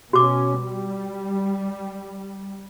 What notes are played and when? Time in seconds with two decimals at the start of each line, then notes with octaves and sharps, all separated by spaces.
0.13 B2 C#4 F#4 D6
0.61 G3